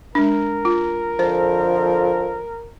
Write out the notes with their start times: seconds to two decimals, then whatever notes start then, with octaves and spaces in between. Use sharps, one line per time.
0.15 G#3 D4 A#4
0.65 F4
1.19 F2 D3 F3 C5